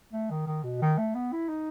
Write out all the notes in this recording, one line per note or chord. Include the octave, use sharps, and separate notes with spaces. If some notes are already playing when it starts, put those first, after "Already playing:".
A3
D#3
D#3
B2
D#3
A3
B3
E4
D#4